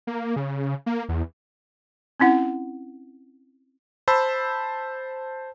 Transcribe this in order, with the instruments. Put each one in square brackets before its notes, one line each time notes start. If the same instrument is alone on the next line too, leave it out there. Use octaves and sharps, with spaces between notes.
[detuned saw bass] A#3
C#3
A#3
E2
[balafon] C4 C#4 E4 F#5
[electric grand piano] C5 A5 B5 E6